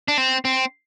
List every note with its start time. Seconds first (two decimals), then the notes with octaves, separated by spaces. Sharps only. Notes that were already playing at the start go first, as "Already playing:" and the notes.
0.08 D4
0.18 C4
0.45 C4